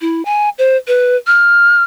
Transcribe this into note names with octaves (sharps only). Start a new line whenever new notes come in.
E4
G#5
C5
B4
F6